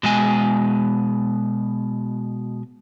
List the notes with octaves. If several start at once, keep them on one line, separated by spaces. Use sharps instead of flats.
B2 G#3 G#5